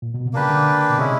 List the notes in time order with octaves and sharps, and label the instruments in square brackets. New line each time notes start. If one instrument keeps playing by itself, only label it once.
[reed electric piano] A#2
B2
C3
[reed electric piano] C#3 [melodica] A#3 D4 G4 B4
[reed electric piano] D3
B2
[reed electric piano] C3 [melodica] G#3 C#4 E4